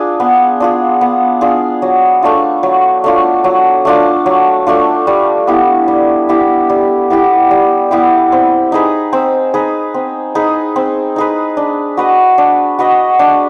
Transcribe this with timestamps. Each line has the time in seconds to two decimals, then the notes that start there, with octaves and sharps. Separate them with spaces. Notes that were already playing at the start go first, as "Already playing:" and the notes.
Already playing: D4 F4 G#4
0.20 B3
0.60 D4 F4 G#4
1.01 B3
1.41 D4 F4 G#4
1.82 F#3
2.23 A3 D4 F4
2.63 F#3
3.04 A3 D4 F4
3.44 F#3
3.85 A3 D4 F4
4.26 F#3
4.67 A3 D4 F4
5.07 G3
5.47 B3 E4 G4
5.88 G3
6.29 B3 E4 G4
6.69 G3
7.10 B3 E4 G4
7.51 G3
7.91 B3 E4 G4
8.32 C4
8.72 D#4 G#4 B4
9.13 C4
9.54 D#4 G#4 B4
9.94 C4
10.35 D#4 G#4 B4
10.76 C4
11.16 D#4 G#4 B4
11.57 D4
11.97 F#4 B4 D#5
12.38 D4
12.79 F#4 B4 D#5
13.19 D4